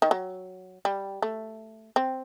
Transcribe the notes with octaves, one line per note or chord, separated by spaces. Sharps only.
D#3
F#3
G3
A3
C4